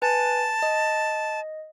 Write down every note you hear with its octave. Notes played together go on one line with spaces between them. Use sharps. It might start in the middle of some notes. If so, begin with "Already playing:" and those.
B4 G#5 A5
D#5